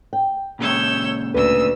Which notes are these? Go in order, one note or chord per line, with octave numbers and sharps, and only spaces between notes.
G5
A#2 C#3 G#3 C#5 E6 G6
D2 B4 E6